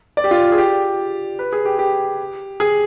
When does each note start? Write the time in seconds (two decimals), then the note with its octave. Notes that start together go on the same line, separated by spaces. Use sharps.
0.17 D5
0.24 G4
0.31 F4
0.52 G#4
0.58 G4
1.39 B4
1.53 G#4
1.65 G4
1.79 G4
2.60 G#4